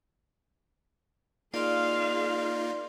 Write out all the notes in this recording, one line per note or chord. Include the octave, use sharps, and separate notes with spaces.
A#3 D#4 F4 G#4 D5 F5 C6